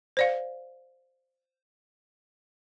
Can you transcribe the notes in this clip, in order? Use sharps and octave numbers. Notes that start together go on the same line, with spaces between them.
C5 D5 F5